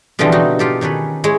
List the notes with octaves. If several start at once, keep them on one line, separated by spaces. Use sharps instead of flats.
B2 D3 E3 F3 G3 C4
D#4 F#4
F4 G4 A4
D#3 C#4 A4 B4
G#3 E4 C#5